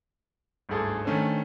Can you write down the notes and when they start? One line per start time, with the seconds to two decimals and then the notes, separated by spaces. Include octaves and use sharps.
0.69 G1 D2 G#2 G#4 A4 A5
1.05 D#3 A3 C#4 D4 A4 C5